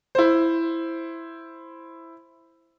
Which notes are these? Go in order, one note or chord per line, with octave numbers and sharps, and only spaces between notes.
E4 C5